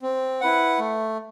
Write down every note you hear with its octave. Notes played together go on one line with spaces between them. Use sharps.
C4
E4 B4 F#5
A3